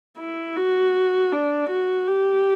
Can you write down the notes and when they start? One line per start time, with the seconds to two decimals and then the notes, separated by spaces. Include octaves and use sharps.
0.18 E4
0.56 F#4
1.32 D4
1.70 F#4
2.08 G4